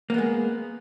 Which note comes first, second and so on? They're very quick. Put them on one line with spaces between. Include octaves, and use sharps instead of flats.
A#3 B3 G#3